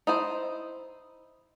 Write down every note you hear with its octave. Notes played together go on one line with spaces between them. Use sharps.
D#4 E4 C5